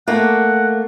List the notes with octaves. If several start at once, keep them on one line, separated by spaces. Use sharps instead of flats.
A3 A#3 F#5